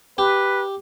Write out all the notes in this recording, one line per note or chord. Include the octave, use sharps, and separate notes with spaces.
G4 B4